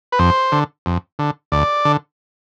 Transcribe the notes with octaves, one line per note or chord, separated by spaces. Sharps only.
B4
F2 C5
D3
F2
D3
D2 D5
D3